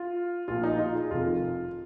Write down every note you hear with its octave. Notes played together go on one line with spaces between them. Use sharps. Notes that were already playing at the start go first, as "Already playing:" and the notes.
Already playing: F4
A#1 A#2 F4
D#4
F4
G#4
F1 F2 D#3 F4